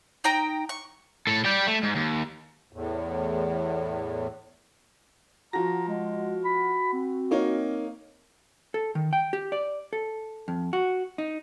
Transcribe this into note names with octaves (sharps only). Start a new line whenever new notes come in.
D#4 G5 A#5
C#6
A2 A4
G3 G5
A3
G#2
D#2
E2 A2
F3 F#4 A#5 A#6
G#3
B5
C4
A#3 D#4 C#5
A4
D#3
G5
G4
D5
A4
F2
F#4
D#4